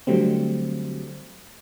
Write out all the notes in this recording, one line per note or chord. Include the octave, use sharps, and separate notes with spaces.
D3 F#3 G3 A3 C4